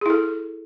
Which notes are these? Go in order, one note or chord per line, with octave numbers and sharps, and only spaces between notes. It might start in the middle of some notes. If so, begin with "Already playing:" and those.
E4 G#4 A4